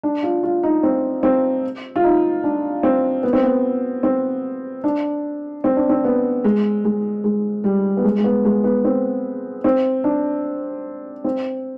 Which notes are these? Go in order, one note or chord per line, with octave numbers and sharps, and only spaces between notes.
D4
F4
F4
D#4
C4
C4
F4
D#4
D4
C4
B3
C4
B3
C4
D4
C4
D4
C4
B3
G#3
G#3
G#3
G3
B3
G#3
G#3
B3
G#3
B3
C4
C4
D4
C4